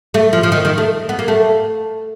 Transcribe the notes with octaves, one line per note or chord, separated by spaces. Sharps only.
A3
F3
F3
D#3
D#3
A3
B3
A#3
A3